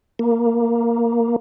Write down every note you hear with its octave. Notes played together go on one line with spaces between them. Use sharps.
A#3